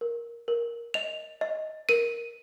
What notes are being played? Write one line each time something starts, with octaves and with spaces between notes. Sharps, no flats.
A#4
A#4
D#5 F7
D#5
A#4 D#7